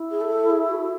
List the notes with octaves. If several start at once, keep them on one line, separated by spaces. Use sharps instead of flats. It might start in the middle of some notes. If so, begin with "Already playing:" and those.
Already playing: E4
G#4
A4
G#4
F#4